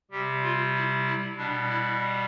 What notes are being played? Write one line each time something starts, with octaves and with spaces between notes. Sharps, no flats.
C3 G3 G4
F4
E4
E4
B2 G3 D4
E4